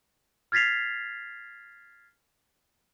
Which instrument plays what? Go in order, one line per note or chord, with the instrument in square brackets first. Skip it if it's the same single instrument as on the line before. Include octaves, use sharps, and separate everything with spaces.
[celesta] F6 G#6 A6 B6 C7 F7